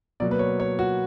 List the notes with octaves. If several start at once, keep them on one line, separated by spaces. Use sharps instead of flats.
B2 F#3 A#3 D5
B4
C#5
C#5
F#4